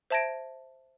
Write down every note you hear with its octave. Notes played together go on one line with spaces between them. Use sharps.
C5 E5 A5 G#6 A#6 D7